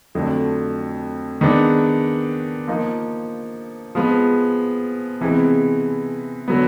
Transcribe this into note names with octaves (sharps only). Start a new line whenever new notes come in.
F2 D3 F#3 A3
D#3 G#3 B3 D4
F3 A#3 D#4
F3 G#3 B3
C3 E3 G#3 B3
D3 F#3 B3